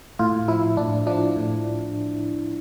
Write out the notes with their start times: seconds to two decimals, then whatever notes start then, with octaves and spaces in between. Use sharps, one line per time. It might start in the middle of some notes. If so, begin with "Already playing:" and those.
0.19 A2 F4
0.48 F3 E4
0.77 A2 D4
1.07 F3 D4
1.36 A2